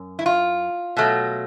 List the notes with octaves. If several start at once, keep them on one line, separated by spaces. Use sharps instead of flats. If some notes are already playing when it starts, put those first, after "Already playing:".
Already playing: F#2
E4
F4
B2 F#3 A3